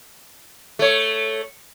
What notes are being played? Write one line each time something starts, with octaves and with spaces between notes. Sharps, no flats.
A3 C#5